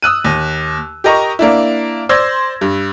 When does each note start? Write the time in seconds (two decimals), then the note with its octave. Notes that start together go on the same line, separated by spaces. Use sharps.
0.02 D#6 E6 F#6 D#7
0.24 D#2
1.04 G4 A#4 D#5 A#5 C#6
1.39 A#3 D4 E4
2.09 C5 D5 C6 E6 G#6 A#6
2.61 G2